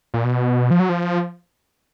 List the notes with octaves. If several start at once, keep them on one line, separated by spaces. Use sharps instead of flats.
A#2
B2
F3
F#3
F3